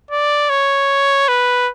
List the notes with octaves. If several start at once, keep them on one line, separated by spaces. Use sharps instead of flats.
D5
C#5
B4